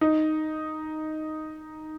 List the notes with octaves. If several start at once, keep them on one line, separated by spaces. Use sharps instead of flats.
D#4